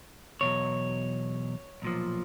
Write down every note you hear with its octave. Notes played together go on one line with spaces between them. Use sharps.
E2 B2 F#3 C#5
B1 A#2 F3